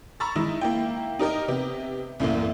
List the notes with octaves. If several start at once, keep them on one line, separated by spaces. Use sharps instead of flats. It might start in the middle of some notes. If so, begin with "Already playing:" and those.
A#5 B5 C#6 E6 A6
D#3 G#3 D#4 E4
A#3 E4 G5
D#4 G4 A#4 D#5
C3 B3 G4
C2 F#2 A2 E3 A#3